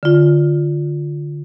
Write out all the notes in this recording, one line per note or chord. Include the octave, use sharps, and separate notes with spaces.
D3 F4